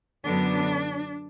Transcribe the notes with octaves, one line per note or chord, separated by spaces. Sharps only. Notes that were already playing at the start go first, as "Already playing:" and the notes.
F#2 D3 F#3 B3 D4